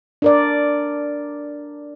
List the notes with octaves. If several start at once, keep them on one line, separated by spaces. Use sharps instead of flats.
D4 A#4 D5